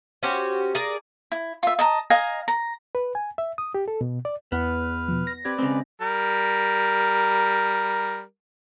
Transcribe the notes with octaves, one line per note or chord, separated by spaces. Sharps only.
C#4 F#4 G4 C5
G#4 A#4 D5
E4
F4 E5
D#5 A5 A#5
D#5 F5 G#5 A#5
A#5
B4
G#5
E5
D#6
G4
A4
B2
D5
E2 B3 B4 F6
B2 F3
A#6
C4 G4 B4 D5 G#6
C#3 G#3 C4
G3 A#4